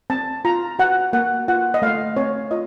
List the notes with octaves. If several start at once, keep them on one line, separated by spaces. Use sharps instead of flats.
C4 A5
F4 A#5
F#4 F#5
A#3 F#5
F4 F#5
D#5
A3 F5
C4 C#5
F4 D#5